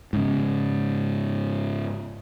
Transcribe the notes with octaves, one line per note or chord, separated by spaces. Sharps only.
G#2 C#3